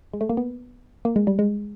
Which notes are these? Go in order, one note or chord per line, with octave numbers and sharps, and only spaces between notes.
G#3
A3
A#3
B3
A#3
G#3
G3
G#3